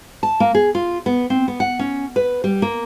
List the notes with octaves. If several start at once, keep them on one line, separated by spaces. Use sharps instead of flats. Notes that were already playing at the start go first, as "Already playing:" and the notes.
A5
A#3
G#4
F4
B3
C4
B3
F#5
C#4
B4
G3
A#3